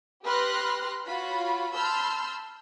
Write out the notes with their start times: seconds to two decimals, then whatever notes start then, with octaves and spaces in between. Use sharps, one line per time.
0.24 G4 B4 C6 F6 F#6 A#6
1.05 F4 F#4 C#5 B5
1.75 A5 B5 C6 E6 F6 G6